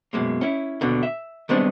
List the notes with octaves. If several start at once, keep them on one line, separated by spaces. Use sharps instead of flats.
F#2 B2 G#3 A#3
C#4 E4
D#2 B2 D3
E5
D#3 G3 G#3 B3 C4 D4